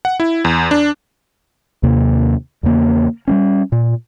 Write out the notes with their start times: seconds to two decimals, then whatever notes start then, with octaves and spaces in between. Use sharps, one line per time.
0.05 F#5
0.20 E4
0.45 E2
0.71 D4
1.83 D#2 C3 A#3
2.63 E2 C#3 A#3
3.28 G3 A3 C#4
3.72 A#2